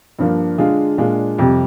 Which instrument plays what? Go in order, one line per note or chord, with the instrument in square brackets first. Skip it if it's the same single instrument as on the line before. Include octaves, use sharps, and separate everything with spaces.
[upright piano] G2 F3 A#3 D4
D3 G#3 D4 F4 G#4
A#2 G#3 D4 F4
F2 C3 G3